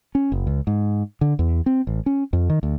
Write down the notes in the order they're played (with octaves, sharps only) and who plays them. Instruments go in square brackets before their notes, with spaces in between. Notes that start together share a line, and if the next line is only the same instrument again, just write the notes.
[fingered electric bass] C#4
F#1
C#2
G#2
D3
E2
C4
A1
C#4
F2
D#3
D2